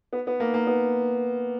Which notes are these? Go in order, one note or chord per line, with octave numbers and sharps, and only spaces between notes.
B3
B3
A#3
A#3
B3